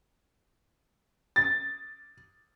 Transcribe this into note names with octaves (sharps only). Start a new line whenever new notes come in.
A6